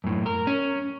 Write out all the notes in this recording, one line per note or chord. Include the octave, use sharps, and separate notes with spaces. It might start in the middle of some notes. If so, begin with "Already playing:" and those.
F#2 A2
A#4
C#4